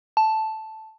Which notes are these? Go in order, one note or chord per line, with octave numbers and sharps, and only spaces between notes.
A5